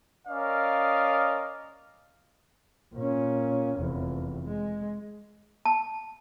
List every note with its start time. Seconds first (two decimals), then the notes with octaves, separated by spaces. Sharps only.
0.27 C#4 A#4 D5 D#5 F5
2.94 A#2 C#4
3.79 F1 E2
4.45 G#3
5.65 A5